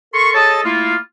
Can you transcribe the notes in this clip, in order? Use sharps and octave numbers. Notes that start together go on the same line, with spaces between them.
A4 A#4 C6 C#6
G#4 A4 C#5 D#5 A5
A3 A#3 E4 F4